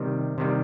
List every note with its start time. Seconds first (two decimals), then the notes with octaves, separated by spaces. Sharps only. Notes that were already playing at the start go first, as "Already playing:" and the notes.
Already playing: C3 D#3 G3
0.38 C3 D#3 G3